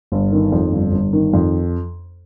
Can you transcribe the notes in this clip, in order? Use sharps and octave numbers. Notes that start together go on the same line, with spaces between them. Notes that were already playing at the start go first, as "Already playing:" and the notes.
G1
D#3
F2
G1
G1
D#3
F2